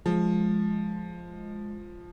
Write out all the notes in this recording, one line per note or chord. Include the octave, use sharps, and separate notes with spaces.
F3 G#3